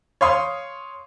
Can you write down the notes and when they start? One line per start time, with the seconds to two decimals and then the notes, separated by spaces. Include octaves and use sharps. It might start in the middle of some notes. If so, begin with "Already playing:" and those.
0.21 C#5 F5 C6 D#6